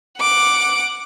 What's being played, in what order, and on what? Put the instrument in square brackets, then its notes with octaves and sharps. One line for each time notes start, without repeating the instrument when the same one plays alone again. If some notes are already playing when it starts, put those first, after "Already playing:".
[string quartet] F#5 D6